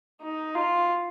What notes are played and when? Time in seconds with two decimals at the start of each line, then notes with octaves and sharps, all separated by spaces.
0.22 D#4
0.55 F4